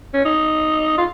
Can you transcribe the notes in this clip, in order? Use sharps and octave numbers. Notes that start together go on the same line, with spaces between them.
C#4
D#4
F4